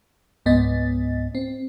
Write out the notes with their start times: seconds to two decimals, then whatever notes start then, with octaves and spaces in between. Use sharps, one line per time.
0.46 C#2 G#2 B3 D#5 A6
1.35 C4